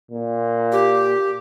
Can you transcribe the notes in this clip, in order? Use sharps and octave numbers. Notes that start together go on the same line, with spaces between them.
A#2
G4